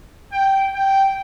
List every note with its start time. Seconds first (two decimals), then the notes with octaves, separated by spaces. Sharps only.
0.32 G5
0.74 G5